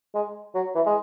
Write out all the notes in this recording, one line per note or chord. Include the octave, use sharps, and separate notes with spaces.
G#3
F#3
E3
G#3